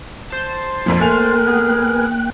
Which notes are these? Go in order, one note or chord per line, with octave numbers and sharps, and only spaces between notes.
C5 A5
A#1 F2 F3
A3 A#3 A#4 G5 G#5 F#6 F7
B3 G#4